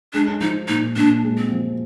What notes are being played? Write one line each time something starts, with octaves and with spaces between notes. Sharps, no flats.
G#3 D4
F3 D#4
A#2 D#4
A#2 D4
G#3
C4
F3